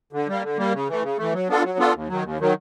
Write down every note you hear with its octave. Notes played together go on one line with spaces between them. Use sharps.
D3
G3 A#3
D3
G3 A#3
C#3
E3 A3
C#3
E3 A3
F#3
B3 D4 F4 A4
F#3
B3 D4 F4 A4
D#2
D#3 F#3
D#2
D#3 F#3